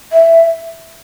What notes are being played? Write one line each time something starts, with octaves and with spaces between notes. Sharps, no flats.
E5